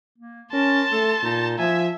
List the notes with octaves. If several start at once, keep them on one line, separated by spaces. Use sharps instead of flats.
A#3
C#4 A#4 A5 C6
A3 A4
A#2 D#4
F3 E5 G#5